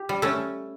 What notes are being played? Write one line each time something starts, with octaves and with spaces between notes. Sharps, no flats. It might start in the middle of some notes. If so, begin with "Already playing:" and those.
Already playing: G4
G3
A3 C#4